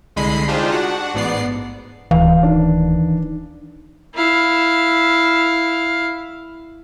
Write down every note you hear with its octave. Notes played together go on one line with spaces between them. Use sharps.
C2 D3 G#3 D#5 B5 C7
D4 D#4 F4 G4 G#4 C5
D4 F#4 F#5
A1 G#2 B3 D5 C7
D1 E3 F5
D#3 D4
E4 F5